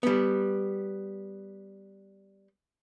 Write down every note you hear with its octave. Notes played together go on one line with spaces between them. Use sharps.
G3 B3